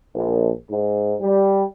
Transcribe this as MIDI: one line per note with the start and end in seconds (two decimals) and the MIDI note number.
0.15 0.51 34
0.70 1.16 44
1.21 1.65 55